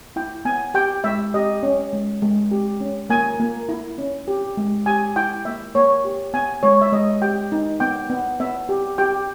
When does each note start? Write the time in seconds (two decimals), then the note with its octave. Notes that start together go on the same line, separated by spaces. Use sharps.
0.16 E4 G5
0.45 B3 G#5
0.74 G4 G5
1.04 G#3 E5
1.34 G4 D#5
1.63 C#4
1.93 G#3
2.22 G#3
2.51 G4
2.81 C#4
3.10 A#3 G#5
3.39 A#3
3.69 E4
3.98 C#4
4.28 G4
4.57 G#3
4.86 G4 G#5
5.16 E4 G5
5.45 A#3 E5
5.75 A#3 C#5
6.05 G4
6.34 B3 G#5
6.63 G#3 C#5
6.81 E5
6.92 G#3 D#5
7.22 G4 G5
7.52 D#4
7.80 B3 G5
8.10 B3
8.40 B3 E5
8.69 G4
8.98 G4 G5